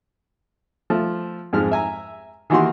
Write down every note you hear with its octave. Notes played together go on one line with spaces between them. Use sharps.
F3 A3
F2 G#2 G#3 F6
E5 G#5 A#5
D#3 E3 A#3 F#4 G4 C6